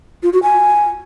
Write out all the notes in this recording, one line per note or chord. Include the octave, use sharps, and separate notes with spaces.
F4
F#4
G#5